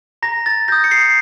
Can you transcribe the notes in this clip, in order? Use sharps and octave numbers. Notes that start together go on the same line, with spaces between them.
A#5 A#6
A6
D#6 G6 A#6
C#7
C7